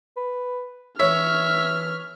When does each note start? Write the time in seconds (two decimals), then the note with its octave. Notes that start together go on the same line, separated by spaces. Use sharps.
0.17 B4
1.00 E3 C#5 E5 F6